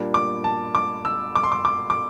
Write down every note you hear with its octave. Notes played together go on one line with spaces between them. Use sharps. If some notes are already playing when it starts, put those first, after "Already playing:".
Already playing: A#2 G3 A#3 D4
D6
A5
D6
E6
D6
C6
D6
D6
D6